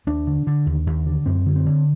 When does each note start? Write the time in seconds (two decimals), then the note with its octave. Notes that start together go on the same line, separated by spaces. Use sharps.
0.07 D#2 D4
0.27 D3
0.47 D3
0.66 D#2
0.87 D#2
1.06 D3
1.26 F#2 C4
1.46 D3
1.56 C4
1.66 D3